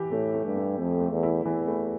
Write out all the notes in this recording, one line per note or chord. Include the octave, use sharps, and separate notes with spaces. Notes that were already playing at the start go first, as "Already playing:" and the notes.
Already playing: E3 G4
A2 A3
A3
G2
A3
F2 A3
A3
E2
E4
E2 E3
A3